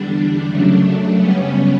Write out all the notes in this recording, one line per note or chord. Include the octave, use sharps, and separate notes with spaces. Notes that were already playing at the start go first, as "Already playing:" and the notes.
Already playing: E2 D3 G3 D4
F#2 C#3 F#3 A3
F#2 C#3 G3 B3 C#4